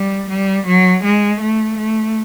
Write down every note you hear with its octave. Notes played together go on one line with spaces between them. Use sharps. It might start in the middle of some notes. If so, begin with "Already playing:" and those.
Already playing: G3
G3
F#3
G#3
A3
A3